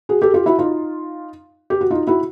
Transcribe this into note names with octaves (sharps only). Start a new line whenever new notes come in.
F#4 G#4
G4 A4
F4 G4
E4 F#4
D#4 F4
G4
F#4
D#4 F4
E4 F#4